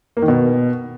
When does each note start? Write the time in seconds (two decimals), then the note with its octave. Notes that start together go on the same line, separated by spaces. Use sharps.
0.17 A#3
0.22 D#3
0.28 B2